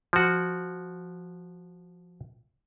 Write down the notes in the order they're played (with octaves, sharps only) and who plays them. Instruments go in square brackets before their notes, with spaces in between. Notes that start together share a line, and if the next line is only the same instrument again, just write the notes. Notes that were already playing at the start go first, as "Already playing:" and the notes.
[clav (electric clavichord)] F3 F#4